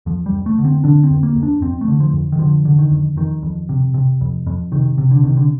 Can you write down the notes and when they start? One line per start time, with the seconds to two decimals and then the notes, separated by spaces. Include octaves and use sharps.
0.06 F2 F3
0.26 G3
0.32 F2
0.46 A3
0.59 D3
0.65 C4
0.84 D3 D4
1.03 C4
1.10 F2
1.23 A#3
1.36 F2
1.43 D4
1.62 F2 C4
1.81 A3
1.88 D3
2.00 F3
2.14 F2
2.32 D#3
2.39 D3 F3
2.65 D3
2.79 D#3
2.91 F2
3.17 F2 D#3
3.43 F2
3.69 C3
3.94 C3
4.21 F2
4.47 F2
4.72 C3 D#3
4.98 C3
5.11 D3
5.24 C3 D#3
5.37 D3